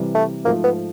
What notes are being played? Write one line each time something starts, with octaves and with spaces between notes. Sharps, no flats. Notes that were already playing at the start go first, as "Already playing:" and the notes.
Already playing: C3 E3 G3
A3
G#2 F3 A3 A#3
B3